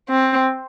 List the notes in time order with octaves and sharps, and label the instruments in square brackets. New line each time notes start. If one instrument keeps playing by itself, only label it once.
[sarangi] C4